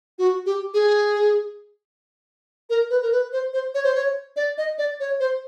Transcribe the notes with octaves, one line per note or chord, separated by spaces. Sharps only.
F#4
G4
G#4
A#4
B4
A#4
B4
C5
C5
C#5
C5
C#5
D5
D#5
D5
C#5
C5